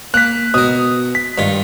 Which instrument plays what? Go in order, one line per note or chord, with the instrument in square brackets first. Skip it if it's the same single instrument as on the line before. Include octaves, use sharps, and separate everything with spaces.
[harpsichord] A#3 [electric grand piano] F#6 B6
[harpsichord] B2 A#4 [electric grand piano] D#6
[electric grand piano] B6
[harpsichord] G2 D#3 F4